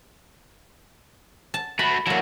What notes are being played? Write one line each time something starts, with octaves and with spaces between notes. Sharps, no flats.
A5
A3 F#4 B5
F#3 A#3 D4 E4 F#4